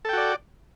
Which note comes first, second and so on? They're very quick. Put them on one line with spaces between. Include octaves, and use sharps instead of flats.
A4 G5 F#4 D5